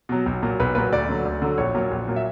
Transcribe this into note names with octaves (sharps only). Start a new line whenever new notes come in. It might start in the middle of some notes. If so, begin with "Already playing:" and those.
B2 F#3
B1
A#2 F#3
B1 B4
A#2 F#3 B4
D2 D5
D3 F#3
D2
D3 F#3
A#1 C#5
A#2 F#3
A#1
A#2 F#3
E5